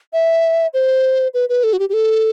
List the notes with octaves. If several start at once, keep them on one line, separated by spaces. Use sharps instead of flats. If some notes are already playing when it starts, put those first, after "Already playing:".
E5
C5
B4
B4
A4
F#4
G4
G4
A4